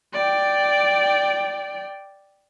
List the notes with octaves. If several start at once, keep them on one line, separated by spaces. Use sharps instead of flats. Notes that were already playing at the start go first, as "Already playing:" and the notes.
D5 G5